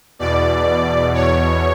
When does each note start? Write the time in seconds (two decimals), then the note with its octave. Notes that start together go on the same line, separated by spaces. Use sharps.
0.19 E2 B2 D5
1.14 C#5